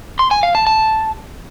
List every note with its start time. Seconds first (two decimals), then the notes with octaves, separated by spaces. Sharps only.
0.19 C6
0.31 G#5
0.43 F5
0.55 A5
0.67 A5